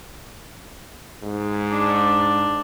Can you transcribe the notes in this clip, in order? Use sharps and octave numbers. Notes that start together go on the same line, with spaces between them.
G#2
D4